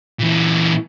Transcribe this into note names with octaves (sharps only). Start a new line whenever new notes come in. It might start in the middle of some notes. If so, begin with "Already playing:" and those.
A#2 E3